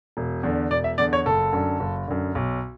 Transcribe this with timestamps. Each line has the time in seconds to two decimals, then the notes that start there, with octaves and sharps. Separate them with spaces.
0.17 E1
0.43 E2 D3
0.71 E1 D5
0.84 E5
0.98 E2 D3 D5
1.13 C#5
1.26 F#1 A4
1.53 F#2 D3
1.80 F#1
2.08 F#2 D3
2.35 B1